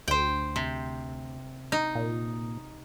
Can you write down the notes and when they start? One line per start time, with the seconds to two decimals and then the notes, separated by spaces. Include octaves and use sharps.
0.08 D2 C5 G5
0.56 C3
1.72 D#4
1.95 A#2